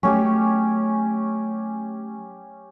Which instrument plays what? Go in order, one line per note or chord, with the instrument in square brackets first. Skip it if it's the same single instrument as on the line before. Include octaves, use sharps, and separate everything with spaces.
[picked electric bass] F#3 A3 [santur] C#4 G4